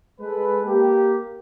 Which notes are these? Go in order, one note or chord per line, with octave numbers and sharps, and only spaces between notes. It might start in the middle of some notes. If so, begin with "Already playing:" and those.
G#3 A4 B4
A#3 G4